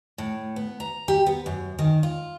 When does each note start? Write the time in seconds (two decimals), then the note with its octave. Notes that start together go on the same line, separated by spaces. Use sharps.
0.18 A2
0.56 B3
0.80 A#5
1.08 G4
1.26 B3
1.46 F#2
1.79 D#3
2.03 F4